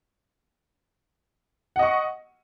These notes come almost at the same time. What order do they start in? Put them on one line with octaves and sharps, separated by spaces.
F#5 D#5 C#6